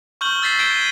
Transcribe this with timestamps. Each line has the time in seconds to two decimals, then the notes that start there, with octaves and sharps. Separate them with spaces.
0.21 C#6 F6 G6 F#7 G7
0.42 E6 G#6 A6 B6 C7 E7
0.59 G6 G#6 D7 E7 G7
0.76 D#7